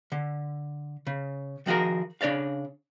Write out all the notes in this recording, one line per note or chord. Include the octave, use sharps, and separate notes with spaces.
D3
C#3
D#3 F3 F#4 G#4 A#4
C#3 D4 C#5 D5 F5